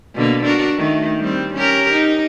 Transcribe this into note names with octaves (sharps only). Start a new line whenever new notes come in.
B2 D3 A#3
D4 F#4 A#4
D#3 A3
G3 C4
C#4 G4 A#4
D#4